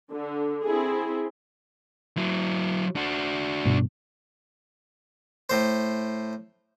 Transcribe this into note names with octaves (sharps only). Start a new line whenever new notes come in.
D3
C4 E4 G#4
F#3 E4
D4 F#4
G2 B2
A2 C5